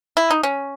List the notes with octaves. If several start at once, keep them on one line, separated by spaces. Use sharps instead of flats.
E4
D#4
C#4